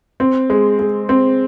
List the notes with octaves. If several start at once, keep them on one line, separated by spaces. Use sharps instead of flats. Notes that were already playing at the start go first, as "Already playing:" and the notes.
C4
G#3
G#3
C4